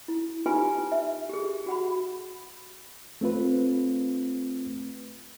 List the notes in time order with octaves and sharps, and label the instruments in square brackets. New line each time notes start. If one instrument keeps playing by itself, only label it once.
[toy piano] E4
D#4 F4 G4 B4 G#5 C6
E5
G4 G#4
F#4 F#5 B5
[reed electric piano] A3 C4 F4 B4